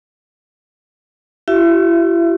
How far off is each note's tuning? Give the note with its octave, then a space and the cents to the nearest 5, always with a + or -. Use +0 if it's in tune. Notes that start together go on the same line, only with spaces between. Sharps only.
E4 +35 G4 -45 E5 +25